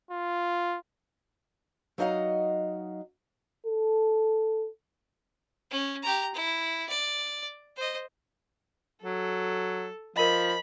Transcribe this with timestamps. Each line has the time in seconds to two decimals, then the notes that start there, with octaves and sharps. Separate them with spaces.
0.11 F4
1.98 F#3 D#4 D#5 F5 F#5
3.66 A4
5.71 C#4
6.03 G4 A#5
6.34 E4
6.89 D5
7.76 C5 D#5
9.03 F#3 A4
10.16 F3 A#4 D#5 B5